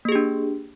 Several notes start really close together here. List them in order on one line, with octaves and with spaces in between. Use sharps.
A#3 G#4 G4 D4